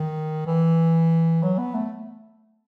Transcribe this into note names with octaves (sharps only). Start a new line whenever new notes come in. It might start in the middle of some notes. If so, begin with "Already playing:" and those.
Already playing: D#3
E3
F#3
B3
A3